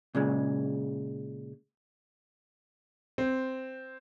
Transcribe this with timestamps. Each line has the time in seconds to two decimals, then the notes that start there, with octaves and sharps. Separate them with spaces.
0.15 A#2 C#3 G#3
3.18 C4